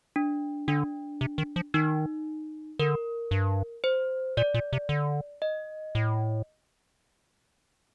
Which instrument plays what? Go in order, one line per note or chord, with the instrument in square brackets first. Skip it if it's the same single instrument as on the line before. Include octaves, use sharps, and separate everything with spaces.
[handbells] D4
[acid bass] D3 [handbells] D4
[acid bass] C3
D#3
F3
[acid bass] D#3 [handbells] D#4
[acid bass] D3 [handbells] A#4
[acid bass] G2
[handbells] C5
[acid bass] A#2 [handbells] D5
[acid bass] A#2
C3
D3
[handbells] D#5
[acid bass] A2